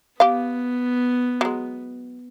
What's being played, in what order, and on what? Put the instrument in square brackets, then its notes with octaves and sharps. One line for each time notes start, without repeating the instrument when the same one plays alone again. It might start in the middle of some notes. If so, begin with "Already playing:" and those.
[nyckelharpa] B3 [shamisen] G4 F5
[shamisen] F#3 G#3